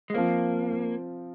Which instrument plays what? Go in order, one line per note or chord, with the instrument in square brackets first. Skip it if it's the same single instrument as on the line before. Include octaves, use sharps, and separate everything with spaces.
[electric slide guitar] G#3
[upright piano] F3 C4 F4 C5 F5 [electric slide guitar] A#3
[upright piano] F3